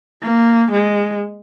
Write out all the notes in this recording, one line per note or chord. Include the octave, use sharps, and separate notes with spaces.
A#3
G#3